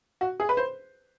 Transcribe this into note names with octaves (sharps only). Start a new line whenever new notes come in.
F#4
G#4
B4
C5